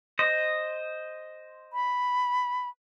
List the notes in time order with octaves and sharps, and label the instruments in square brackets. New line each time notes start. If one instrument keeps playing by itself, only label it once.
[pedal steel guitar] C5 D#5
[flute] B5